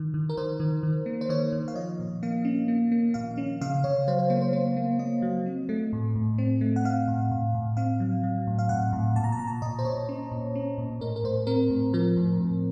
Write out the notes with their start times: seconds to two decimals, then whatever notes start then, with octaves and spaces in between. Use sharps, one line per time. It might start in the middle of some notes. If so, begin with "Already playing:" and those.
Already playing: D#3
0.14 D#3
0.29 A#4
0.37 D#3 C5
0.60 D#3
0.83 D#3
1.06 A#3
1.21 C5
1.29 D#3 C#5
1.52 D#3
1.68 F5
1.75 F3 D#5
2.00 A#2
2.23 A#3 F5
2.45 C#4
2.68 A#3
2.92 A#3
3.14 A#2 F5
3.37 C#4
3.61 C#3 F5
3.84 C#3 C#5
4.08 F#3 C5
4.19 C5
4.30 A#3 C5
4.42 C5
4.53 A#3 C5
4.77 A#3
4.99 A#3 D#5
5.22 F#3
5.46 C4
5.69 A3
5.93 A2
6.16 A2
6.38 C4
6.61 A3
6.76 F#5
6.84 C4 F5
7.08 A2
7.31 A2
7.55 A2
7.77 C4 F5
8.00 F#3
8.23 F#3
8.47 A2
8.59 F5
8.69 A2 F#5
8.93 A2
9.16 A#2 A5
9.24 A#5
9.32 A5
9.39 A#2 A#5
9.47 A5
9.62 A#2 D#5
9.79 C5
9.85 A#2 C#5
10.09 C#4
10.31 A#2
10.55 C#4
10.78 A#2
11.01 A2 A#4
11.16 A#4
11.24 A2 C5
11.47 C4 A#4
11.70 A2
11.94 F3 A#4
12.17 A2
12.40 A2